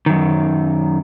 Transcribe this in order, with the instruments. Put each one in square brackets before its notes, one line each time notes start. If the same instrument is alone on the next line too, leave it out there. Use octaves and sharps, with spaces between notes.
[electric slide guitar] F#2 D#3